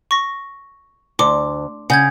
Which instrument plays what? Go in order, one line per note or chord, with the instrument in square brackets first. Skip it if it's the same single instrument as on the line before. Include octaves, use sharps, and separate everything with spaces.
[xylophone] C#6 A#6
[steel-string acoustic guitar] D2 [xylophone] C6 D6
[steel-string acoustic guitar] C#3 [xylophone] F#5 G6 G#6